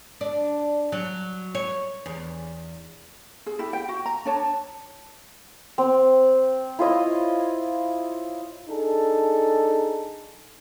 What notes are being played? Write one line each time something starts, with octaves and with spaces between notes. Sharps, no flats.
D4
F#3
C#5
E2
G#4
E4 G4
G5
F#4
A#5
D4 C#5 A5
C4
E4 F4 C#5 D#5
D4 D#4 G#4 A4